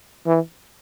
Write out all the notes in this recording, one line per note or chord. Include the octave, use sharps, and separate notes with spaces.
E3